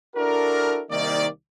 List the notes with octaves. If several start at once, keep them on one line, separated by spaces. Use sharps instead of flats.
D4 E4 F#4 A4 A#4
C2 D#3 A#3 D5